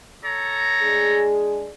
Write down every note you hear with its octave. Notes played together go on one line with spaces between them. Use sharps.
A4 C#5 A#5
G#3 D4 G#4